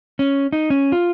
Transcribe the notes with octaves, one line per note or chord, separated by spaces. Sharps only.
C#4
D#4
C#4
F4